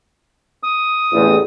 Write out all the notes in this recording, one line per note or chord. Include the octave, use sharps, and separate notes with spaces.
D#6
A1 E2